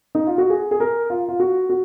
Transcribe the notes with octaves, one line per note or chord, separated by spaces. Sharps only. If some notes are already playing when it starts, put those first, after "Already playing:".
D#4
F4
F#4
G#4
G#4
A#4
F4
F4
F#4
F#4